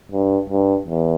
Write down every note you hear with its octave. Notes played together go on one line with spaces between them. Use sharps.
G2
G2
E2